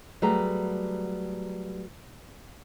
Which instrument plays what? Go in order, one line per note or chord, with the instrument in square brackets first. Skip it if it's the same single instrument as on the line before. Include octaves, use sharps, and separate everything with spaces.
[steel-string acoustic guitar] F#3 G3 A3 G#4 B4 A#5